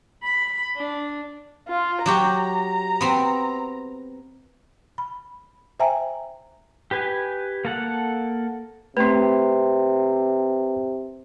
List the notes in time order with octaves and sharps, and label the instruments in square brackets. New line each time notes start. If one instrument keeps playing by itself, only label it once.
[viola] B5
D4
[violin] F4
[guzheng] F#3 G4 C#5 [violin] A#5
[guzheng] B3 C4
[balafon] B5
C5 E5 G5 G#5 A#5
[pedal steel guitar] G4 B4 G#5
A#3 A4 F#5
[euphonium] C3 [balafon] A3 C4 [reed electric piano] B4 C6